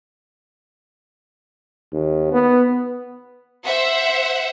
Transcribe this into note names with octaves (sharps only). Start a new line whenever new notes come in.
D#2
B3
C5 E5 F#5